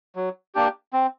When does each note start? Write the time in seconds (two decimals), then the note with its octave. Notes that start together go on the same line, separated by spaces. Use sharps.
0.16 F#3
0.55 A#3 D4 G4
0.93 C4